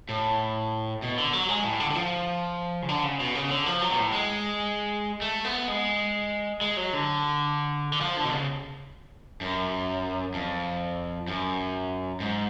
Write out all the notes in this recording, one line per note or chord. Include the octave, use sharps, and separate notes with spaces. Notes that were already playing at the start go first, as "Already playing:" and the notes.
A2
B2
D3
F#3
G#3
A2
D3
D3
F3
C#3
D3
C#3
B2
C#3
D3
F3
F#3
B2
A2
G#3
A3
B3
G#3
G#3
F#3
D3
D3
F3
D3
B2
C#3
F#2
F2
F#2
G#2